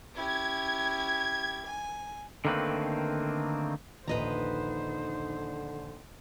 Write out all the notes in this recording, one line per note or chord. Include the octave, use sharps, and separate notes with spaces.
C#4 E4 G4 G#6
G#5
D3 D#3 A3 A#3 C4 B4
A#1 D#2 D3 D#4 B4 C5 D#5 A#5